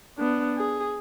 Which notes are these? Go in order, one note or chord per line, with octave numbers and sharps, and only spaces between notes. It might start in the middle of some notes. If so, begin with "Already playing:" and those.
B3 D4
G#4